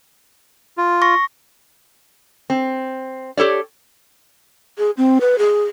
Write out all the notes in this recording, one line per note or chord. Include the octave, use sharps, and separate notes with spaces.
F4
C#6 A#6
C4
G4 A4 C#5 D5
G#4
C4
B4
G#4